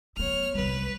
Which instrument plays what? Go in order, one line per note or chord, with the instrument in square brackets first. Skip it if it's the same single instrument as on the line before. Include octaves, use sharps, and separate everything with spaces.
[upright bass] F#3 B3 [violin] C#5 F6
[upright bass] C2 G3 [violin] B4